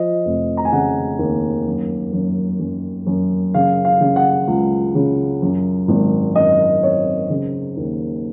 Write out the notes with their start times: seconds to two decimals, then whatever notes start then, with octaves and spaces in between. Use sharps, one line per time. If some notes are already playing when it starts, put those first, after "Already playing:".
Already playing: F3 D#5
0.25 F1
0.57 A#5
0.65 G#5
0.72 C#3 F#5
1.19 D#2
1.67 F#2
2.12 F#2
2.60 F#2
3.06 F#2
3.54 C#3 F5
3.85 F5
4.01 C#3
4.16 F#5
4.48 C#2
4.95 C#3
5.42 F#2
5.88 G#1
6.35 F#2 D#5
6.83 C4 C#5
7.30 C#3
7.77 D#2